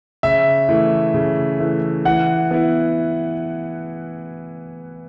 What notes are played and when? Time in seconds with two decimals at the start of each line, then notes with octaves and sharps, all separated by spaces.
0.23 C#3 E5
0.69 E3 A3
1.14 C#3
1.59 E3 A3
2.05 E3 F#5
2.51 B3 E4